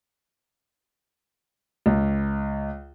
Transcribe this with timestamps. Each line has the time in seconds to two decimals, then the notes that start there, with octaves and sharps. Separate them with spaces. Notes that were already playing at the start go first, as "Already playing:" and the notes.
1.86 C#2